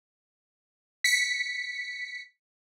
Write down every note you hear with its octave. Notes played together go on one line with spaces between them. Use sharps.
B6 C#7